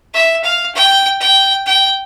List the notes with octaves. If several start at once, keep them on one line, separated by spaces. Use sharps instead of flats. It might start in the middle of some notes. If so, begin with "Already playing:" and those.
E5
F5
G5
G5
G5